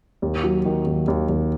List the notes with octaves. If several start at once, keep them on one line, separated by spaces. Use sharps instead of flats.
D#2
F#3
D#3
D#2
D#2
D#2